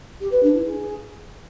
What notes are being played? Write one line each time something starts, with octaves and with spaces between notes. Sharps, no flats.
G4
B4
D4
E4
G#4